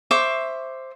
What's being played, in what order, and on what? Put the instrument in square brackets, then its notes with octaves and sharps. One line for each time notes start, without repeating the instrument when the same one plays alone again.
[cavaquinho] C5 E5 C#6 D6